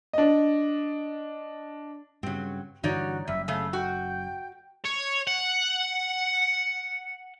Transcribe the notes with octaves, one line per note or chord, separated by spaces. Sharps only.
D4 D#5
G2 C#3 F#3 C4
G2 D3 E3 D#4 F#4 C#5 D5
F#1 F#2 G3 E5
C#3 A3 F5
F#4 G5
C#5
F#5